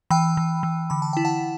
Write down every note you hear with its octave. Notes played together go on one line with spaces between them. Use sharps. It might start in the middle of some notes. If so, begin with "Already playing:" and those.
E3 G5 B5
E3
E3
D3 B5
A5
E4 G5
F#5 A5